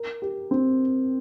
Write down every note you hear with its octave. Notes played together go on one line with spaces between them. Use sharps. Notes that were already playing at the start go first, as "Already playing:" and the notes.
Already playing: A#4
G4
C4